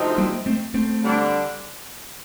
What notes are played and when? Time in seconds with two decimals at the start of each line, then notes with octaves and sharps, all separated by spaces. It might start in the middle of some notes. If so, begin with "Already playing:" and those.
Already playing: D2 C3 F3 C4 D#4
0.18 G3 A#3
0.46 A3 C4
0.74 A3 C4
1.02 D3 G3 D4